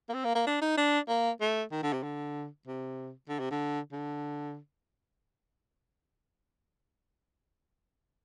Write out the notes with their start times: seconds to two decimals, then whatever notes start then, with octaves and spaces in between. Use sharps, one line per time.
0.09 A#3
0.14 C4
0.25 A#3
0.35 A#3
0.47 D4
0.62 D#4
0.77 D4
1.09 A#3
1.41 A3
1.72 D#3
1.83 D3
1.93 C3
2.03 D3
2.67 C3
3.29 D3
3.39 C3
3.51 D3
3.92 D3